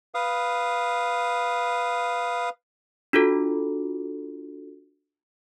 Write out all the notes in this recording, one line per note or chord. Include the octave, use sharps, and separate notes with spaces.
B4 F5 D#6
D4 F4 F#4 A4